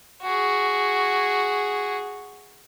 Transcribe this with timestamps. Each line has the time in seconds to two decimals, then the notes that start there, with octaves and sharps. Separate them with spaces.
0.23 F#4 G#4